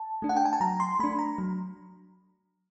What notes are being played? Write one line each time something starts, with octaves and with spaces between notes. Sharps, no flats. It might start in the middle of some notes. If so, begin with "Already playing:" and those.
Already playing: A5
A3 D4
F#5
G5
G#5
A5
F#3 A#5
C6
A3 D4 B5
A#5
F#3